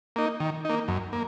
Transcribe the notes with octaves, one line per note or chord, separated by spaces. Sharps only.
A#3 D#4
D#3
A#3 D#4
F#2
A#3